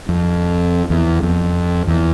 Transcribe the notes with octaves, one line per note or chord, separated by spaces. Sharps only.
F2
E2
F2
E2